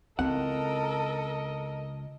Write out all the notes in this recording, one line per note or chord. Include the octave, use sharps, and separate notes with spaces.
C#2 D#3 C4 E4 A4 A#4 D#5 F#5